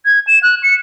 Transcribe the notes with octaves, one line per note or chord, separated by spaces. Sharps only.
G#6
E7
F#6
C#7